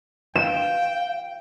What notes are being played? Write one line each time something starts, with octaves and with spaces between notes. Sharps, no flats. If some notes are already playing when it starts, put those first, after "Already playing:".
F5 G5 E7